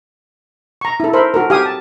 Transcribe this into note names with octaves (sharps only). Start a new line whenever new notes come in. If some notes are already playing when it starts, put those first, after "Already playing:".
A#5 C#6
E4 A4
A#4 C5 E5 B5
F#4 A4 A#4
G4 F5 G#5 D#6
A5